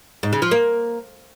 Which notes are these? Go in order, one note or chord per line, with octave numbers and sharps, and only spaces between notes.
G#2
C#3
F3
A#3